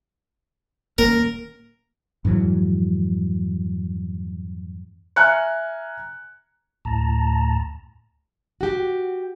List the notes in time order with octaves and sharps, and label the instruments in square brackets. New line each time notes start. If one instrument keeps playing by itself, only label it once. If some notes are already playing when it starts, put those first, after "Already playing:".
[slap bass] D#1 A#3 C#4 [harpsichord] A#4
[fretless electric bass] F2 G#2 E3 F#3
[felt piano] E5 G#5 A#5 F6 F#6 C#7
[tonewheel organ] D2 A2 A5 A#5
[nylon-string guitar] F#4 G4